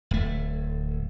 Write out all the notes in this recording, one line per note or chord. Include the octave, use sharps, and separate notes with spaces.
D1 A3